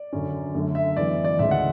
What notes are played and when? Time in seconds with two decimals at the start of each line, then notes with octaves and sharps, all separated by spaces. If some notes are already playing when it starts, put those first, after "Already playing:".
Already playing: D5
0.13 F#2 D3 F#3 C#4
0.54 F#2 D3 A3
0.75 E5
0.96 F#2 E3 G#3 B3 D5
1.25 D5
1.39 D2 C#3 E3 G#3 E5
1.51 F#5